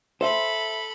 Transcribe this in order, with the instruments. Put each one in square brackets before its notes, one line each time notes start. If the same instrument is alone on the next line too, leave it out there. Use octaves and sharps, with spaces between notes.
[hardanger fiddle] A4 B5 [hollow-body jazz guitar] C5 E5